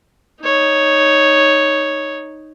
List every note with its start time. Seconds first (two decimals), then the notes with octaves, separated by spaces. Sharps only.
0.42 D#4 C#5